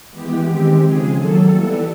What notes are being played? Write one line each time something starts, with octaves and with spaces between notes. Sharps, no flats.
E3 G#3 B3 G4
D#3 G#3 C4 G4
C#3 F3 G#3 G#4
D#3 F#3 A#3 A4
E3 G3 B3